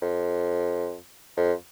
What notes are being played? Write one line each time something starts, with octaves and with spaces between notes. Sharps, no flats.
F2
F2